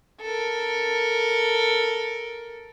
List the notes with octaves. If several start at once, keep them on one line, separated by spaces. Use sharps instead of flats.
A4 A#4